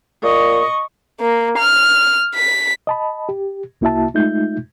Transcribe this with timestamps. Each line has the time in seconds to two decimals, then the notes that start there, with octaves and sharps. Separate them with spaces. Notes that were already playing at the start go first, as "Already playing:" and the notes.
0.23 A#2 D#5 C#6
1.21 A#3
1.58 F6
2.35 B6
2.87 D#5 A5 B5
3.29 G4
3.81 C2 A#3 E4 F#4 E5 A5
4.14 G#3 A3 D#4 F4 E5 G6